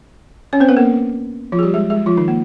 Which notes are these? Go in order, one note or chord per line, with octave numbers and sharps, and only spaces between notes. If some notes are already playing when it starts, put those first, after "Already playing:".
C#4 C#5
C4 C5
B3 B4
A#3 A#4
F3 F4
G#4
G3 G4
G#3 G#4
G#3 G#4
F3 F4
D#3 D#4
A#3